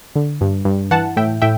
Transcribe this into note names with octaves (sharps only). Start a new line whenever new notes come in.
D3
G2
G2
E3 F#5 A5
A2 E5 G5
A2 E5 G5